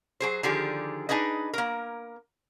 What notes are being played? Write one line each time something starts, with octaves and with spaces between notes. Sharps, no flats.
F#3 G#4 C5
D3 D#3 F3 G4 G#4
D4 D#4 G#4 B4 D#5
A#3 A#4